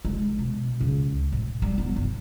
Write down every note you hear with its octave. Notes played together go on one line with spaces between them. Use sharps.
G#3
B2
C#2
A2
G3
B3
G1